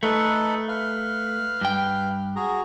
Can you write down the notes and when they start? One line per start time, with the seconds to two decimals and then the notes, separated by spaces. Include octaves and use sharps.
0.03 A3 D#4 A4 B4
0.68 B4 F5
1.61 G2 G5
2.36 F#4 G#4 A#5